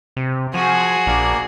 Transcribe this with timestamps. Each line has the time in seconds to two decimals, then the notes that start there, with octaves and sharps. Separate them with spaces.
0.17 C3
0.54 F3 F#4 G#4 G#5
1.07 A#1 A#3 D4 A#4